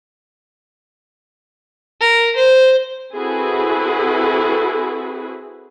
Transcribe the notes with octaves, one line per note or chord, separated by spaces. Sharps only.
A#4
C5
C4 E4 F#4 G#4 A4 B4